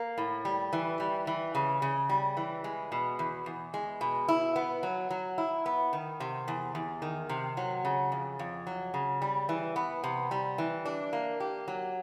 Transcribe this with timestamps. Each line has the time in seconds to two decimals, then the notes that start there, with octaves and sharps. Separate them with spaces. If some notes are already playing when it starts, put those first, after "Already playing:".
Already playing: A#3
0.18 A2
0.45 G3
0.73 E3
1.00 G3
1.27 E3
1.55 C#3
1.82 C#3
2.09 G3
2.37 E3
2.64 G#3
2.92 B2
3.19 E2
3.46 E2
3.74 G#3
4.01 B2
4.28 E4
4.56 B3
4.83 F#3
5.10 F#3
5.38 E4
5.66 B3
5.93 D#3
6.20 C3
6.48 E2
6.75 E2
7.02 D#3
7.29 C3
7.57 F#3
7.85 C#3
8.12 F2
8.39 F2
8.67 F#3
8.94 C#3
9.22 G3
9.49 E3
9.76 B3
10.04 C3
10.31 G3
10.58 E3
10.85 D4
11.13 A#3
11.40 G4
11.68 F#3